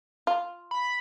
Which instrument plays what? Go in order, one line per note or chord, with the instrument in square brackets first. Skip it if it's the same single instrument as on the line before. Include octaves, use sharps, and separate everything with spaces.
[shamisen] F4
[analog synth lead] B5